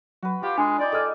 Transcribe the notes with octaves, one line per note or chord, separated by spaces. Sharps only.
F#3 F#4 B4
F4 G4 F5
G#3 D4 G#5
D#4 D5 G5
G#3 G#4 A4 G#5 D6 F6